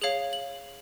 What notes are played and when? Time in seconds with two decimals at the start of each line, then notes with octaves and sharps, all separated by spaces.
0.01 G#4 C#5 F5 F#7
0.33 F#7